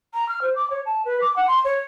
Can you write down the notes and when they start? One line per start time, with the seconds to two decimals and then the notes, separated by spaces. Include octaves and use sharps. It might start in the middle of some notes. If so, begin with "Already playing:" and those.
0.14 A#5
0.29 F6
0.41 C5
0.55 D6
0.70 C#5
0.86 A5
1.05 B4
1.21 D6
1.36 F#5
1.47 C6
1.64 C#5